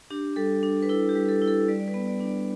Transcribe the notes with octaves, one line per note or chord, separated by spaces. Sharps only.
D4 G4
G3 A4
D4
B4
E4 A4
G4
G3
A4
E4
A4
G3 D5
D5
B4
B3
D5
D4
D5